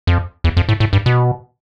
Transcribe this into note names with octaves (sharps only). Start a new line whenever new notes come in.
F2
E2
F2
A2
A2
G2
B2